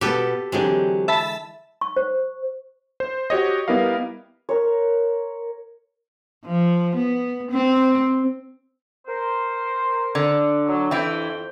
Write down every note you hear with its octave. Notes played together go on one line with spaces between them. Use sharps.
B2 B3 G4 A4 B4
D3 E3 F#3 G#3 C4 G4
E5 A5 B5
C#6
C5
C5
F#4 G4 C#5 D#5
G3 B3 E4 A#4 D#5 F5
A#4 C#5
F3
B3
C4
A#4 C5
D3
F#3
F2 E3 E4 G5